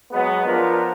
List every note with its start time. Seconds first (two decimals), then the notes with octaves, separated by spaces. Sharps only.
0.12 F#3 G#3 B3
0.46 F3 B3 D4 F4 A#4